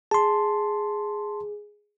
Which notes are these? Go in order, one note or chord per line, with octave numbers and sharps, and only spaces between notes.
G#4 A5 C6